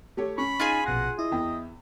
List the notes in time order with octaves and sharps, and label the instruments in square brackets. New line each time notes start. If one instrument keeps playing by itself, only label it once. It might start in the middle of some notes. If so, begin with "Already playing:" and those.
[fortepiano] A3 G4 C#5
[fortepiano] C#4 [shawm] B5 [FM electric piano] C#6
[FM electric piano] D#4 [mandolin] F4 G#4 G#5
[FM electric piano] A#1 B2 A#6 [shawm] F#5
[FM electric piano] E4 [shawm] D#5
[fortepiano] E2 G5